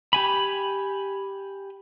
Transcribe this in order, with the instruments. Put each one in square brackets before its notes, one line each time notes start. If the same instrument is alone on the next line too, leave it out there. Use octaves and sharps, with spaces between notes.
[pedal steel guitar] G4 G#5 B5